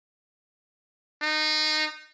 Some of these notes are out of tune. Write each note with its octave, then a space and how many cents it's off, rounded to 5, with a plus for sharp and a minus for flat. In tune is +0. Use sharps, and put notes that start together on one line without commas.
D#4 -20